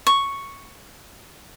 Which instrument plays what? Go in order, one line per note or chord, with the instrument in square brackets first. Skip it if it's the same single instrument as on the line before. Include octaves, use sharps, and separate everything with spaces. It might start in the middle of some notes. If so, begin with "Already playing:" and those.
[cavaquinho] C#6